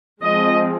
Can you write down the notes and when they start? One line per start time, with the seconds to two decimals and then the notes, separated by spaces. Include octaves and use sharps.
0.22 F3 G#3 C4 D#5